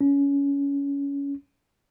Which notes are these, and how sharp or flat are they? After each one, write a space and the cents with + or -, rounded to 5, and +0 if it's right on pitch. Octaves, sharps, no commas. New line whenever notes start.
C#4 +20